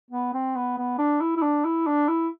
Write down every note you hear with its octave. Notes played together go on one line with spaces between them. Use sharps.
B3
C4
B3
B3
D4
E4
E4
D4
E4
D4
E4